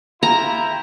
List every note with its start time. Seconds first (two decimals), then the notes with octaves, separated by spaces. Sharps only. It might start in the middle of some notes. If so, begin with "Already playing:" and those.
0.23 E4 F4 G4 A#5